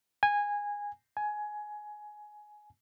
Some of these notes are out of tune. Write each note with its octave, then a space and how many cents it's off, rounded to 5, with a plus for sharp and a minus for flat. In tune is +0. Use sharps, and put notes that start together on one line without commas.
G#5 -15
G#5 +15